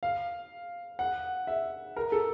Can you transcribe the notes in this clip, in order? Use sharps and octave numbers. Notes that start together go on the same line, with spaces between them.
F5
F#5
E5
A#4
A4